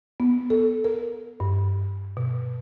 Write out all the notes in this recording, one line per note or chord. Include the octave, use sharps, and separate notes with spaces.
B3
A4
A#4
G2
B2